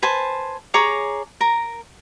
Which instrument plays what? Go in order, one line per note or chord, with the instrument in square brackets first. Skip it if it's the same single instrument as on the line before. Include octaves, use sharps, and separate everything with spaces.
[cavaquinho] B4 C5 G#5 A5
G#4 C#5 A#5 D6
A#4 A#5